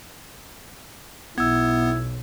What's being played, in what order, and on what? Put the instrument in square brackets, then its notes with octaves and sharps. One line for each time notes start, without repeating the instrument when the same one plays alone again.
[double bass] B1 [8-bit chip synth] B3 [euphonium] E4 [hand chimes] E6 G#6